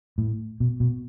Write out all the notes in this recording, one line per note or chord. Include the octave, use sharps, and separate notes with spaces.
A2
B2
B2